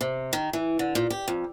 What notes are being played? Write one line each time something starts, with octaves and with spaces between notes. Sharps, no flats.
C3
D#3
E3
D3
A#2
G4
F2